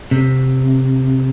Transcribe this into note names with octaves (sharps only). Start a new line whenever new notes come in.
C3